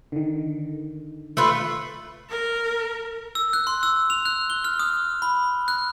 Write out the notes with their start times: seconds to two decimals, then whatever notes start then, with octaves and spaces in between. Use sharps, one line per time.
0.12 D3 D#3
1.37 A3 F4 B4
2.30 A#4
3.35 E6
3.53 F#6
3.67 C6
3.83 E6
4.10 F7
4.26 F#6
4.50 G7
4.64 F6
4.80 D#6
5.22 B5
5.68 F#6